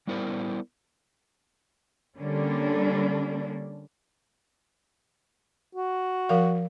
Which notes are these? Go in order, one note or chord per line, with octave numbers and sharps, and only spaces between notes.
G3 B3 E4 A#4 C5 D5
D3 G3 A#3 C#4 D4
F#4
F3 A#4 F5